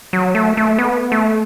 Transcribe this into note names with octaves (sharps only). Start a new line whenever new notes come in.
F#3
A3
A3
B3
A3